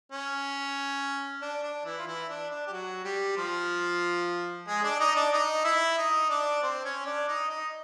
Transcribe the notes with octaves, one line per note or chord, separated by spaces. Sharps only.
C#4
D4
D4
E3 E4
F4
E3 E4
D4
D4
G4
F#3 F#4
G3 G4
F3 F4
G#3 G#4
D4 D5
D#4 D#5
D4 D5
D#4 D#5
E4 E5
D#4 D#5
D4 D5
C4 C5
C#4 C#5
D4 D5
D#4 D#5
D#4 D#5